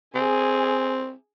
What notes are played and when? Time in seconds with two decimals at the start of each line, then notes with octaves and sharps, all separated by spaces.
0.15 C4 G#4 G#5